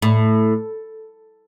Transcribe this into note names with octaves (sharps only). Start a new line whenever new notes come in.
A2